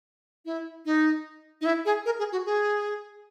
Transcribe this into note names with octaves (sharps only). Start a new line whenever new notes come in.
E4
D#4
D#4
E4
G#4
A#4
G#4
F#4
G#4